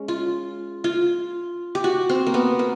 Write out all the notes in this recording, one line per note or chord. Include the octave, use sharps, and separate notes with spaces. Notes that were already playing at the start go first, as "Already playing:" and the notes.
Already playing: G#3 C#4
F4
F4
G4
F#4
C4
A#3
B3
A#3